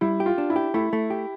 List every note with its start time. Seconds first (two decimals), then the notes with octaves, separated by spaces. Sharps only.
0.01 G3 E4
0.20 G4
0.26 F4
0.38 D4
0.50 E4
0.56 G4
0.74 A3 E4
0.93 A3
1.10 G4